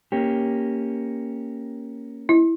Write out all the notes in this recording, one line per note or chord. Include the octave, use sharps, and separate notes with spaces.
A#3 C#4 G4
E4